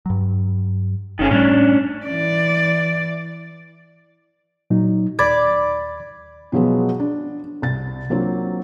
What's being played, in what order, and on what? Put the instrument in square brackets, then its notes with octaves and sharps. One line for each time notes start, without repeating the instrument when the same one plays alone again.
[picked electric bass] G2 F#3
[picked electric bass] G1 [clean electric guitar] D#3 C#4 G#4
[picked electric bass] A2 G3 A3 [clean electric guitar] C#4 D4
[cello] E3 D5
[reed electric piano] A#2 F#3 D#4
[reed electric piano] D#2 B5 G#6 [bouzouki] D5
[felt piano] B2 F3 F#3 G#3 B3
D4
C2 A6
F#3 A#3 C4 D4 F4